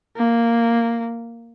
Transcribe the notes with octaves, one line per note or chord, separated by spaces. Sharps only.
A#3